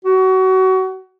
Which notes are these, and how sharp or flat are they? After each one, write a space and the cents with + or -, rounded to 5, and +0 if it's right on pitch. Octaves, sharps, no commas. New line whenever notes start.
F#4 +25